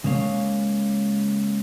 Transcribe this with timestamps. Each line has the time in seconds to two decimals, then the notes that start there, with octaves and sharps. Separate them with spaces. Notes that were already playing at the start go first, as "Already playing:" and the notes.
0.04 C#3 G#3 A#3 C#5 F5